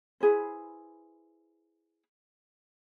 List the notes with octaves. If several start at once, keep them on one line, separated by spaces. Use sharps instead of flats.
E4 G#4 B4 C5